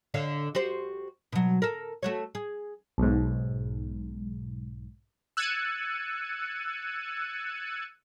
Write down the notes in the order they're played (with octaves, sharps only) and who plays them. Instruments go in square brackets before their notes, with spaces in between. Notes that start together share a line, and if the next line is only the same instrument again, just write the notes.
[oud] D3 C#5 F5
F#4 G4 C5
B2 F#3
A4 A#4
A3 F#4 C#5
G#4
[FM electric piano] B1 G#2
[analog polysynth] E6 F#6 G#6 A6 C#7 D#7